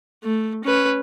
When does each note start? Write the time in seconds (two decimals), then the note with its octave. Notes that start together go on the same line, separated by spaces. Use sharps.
0.24 A3
0.64 C#4 B4